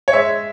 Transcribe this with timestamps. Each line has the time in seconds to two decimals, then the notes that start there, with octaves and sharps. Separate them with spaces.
0.08 C#5
0.13 G#3 E5